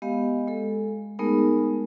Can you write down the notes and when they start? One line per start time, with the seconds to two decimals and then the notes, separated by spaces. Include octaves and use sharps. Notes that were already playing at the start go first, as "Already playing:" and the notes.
0.02 G#3 B3 G4 D#5 F5
0.48 G#3 A4
1.19 G#3 A3 B3 D#4 G#4 A#4